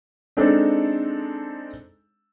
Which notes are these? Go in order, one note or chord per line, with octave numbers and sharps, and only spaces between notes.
G#3 C4 D4 D#4 A4